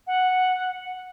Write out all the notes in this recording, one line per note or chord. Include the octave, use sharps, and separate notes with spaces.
F#5